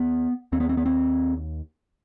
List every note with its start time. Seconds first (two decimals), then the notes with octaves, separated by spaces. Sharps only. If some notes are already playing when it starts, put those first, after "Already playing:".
Already playing: D#2 B3
0.52 D#2 C4
0.60 B3
0.69 C4
0.77 B3
0.86 C4